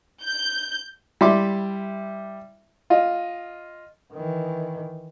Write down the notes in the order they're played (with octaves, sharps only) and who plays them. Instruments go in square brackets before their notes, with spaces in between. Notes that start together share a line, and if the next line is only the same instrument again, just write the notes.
[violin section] G6
[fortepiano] G3 E4 E5 C6 D6
F4 D#5
[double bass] D#3 E3